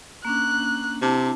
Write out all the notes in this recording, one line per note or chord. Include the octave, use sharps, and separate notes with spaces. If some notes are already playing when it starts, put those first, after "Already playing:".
A#3 C#4 D4 F#6
C3 C4 D4 E4 A5